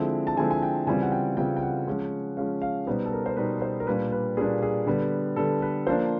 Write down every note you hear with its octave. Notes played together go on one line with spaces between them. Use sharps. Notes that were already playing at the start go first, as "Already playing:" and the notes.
Already playing: D3 F3 G#3 C4 E4
A5
D3 F3 G#3 C4 E4 G#5
G#5
G5
C#3 E3 G3 C4 F4 G#5
F#5
G5
C#3 E3 G3 C4 F4 G5
G5
F#5
F3 G#3 C#4
F3 G#3 C#4 F5
F5
B2 G3 B3 D#4 C5
A4
A#4
C5
B2 G3 B3 D#4 B4
C5
A#4
A#2 G3 A#3 D4 B4
B4
A#2 G3 A#3 D4 G#4
G#4
D3 G3 B3
D3 G3 B3 A4
B4
F3 A#3 D4 C5